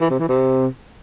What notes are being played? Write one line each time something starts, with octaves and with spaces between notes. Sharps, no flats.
E3
C3
E3
C3